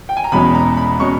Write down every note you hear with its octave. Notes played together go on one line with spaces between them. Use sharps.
G5
G#5
A#5
E2 B2 G#3 C#4 B5
A#5
B5
B2 G#3 C#4 C#6